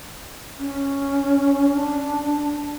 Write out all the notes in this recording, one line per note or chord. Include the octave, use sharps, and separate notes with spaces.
C#4
D4